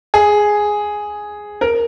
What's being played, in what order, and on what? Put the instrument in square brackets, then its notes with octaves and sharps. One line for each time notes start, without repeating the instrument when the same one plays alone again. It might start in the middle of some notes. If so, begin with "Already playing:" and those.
[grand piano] G#4
A#4